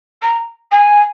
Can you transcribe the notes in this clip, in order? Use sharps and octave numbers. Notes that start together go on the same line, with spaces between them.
A#5
G#5